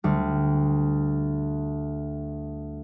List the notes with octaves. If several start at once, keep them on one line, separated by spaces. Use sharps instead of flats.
D2 G3